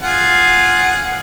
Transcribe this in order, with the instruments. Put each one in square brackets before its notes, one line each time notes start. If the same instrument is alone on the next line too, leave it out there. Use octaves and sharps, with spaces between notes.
[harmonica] F4 G#4 F#5